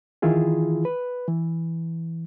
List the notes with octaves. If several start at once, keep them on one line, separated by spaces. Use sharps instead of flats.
D#3 E3 E4 F4 G#4
B4
E3